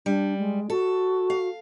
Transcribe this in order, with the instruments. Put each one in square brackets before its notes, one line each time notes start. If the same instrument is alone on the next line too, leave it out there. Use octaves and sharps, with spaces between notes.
[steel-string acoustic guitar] G3 [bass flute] D4
[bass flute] G#3
[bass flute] F#4 [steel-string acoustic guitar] A4
[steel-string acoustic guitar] F5